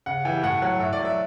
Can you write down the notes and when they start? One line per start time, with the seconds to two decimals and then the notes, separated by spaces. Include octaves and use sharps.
0.06 C#3 F#5
0.25 E3 G3 G5
0.43 A2 F#5
0.62 F#3 F#5
0.80 A2 E5
0.93 D5
0.99 F#3
1.05 E5